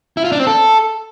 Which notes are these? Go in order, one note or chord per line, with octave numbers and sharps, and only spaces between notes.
E4
F4
D4
C4
A4